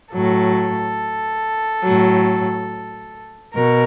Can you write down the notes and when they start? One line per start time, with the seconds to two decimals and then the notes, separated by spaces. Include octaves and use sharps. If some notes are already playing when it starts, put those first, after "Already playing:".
0.13 A2 F#3 A4
1.83 A2 F#3
3.53 B2 A#4